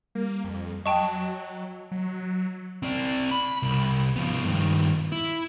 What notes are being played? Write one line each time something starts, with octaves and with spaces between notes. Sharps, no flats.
G3 A#3
F2
F#3 D#5 G5 A5 C#6
F#3
C4 D5
B5
C2
F3 B3
G2 D#3
E4